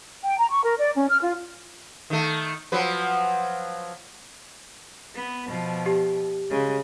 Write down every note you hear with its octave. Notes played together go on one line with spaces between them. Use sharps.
G5
A#5
C#6
A#4
D5
C#4
F6
F4
D#3 A3
F3 F#3 B4
B3
B2 F3
G4
C#3 G#3